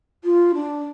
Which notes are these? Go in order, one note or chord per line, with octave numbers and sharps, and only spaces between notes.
F4
D4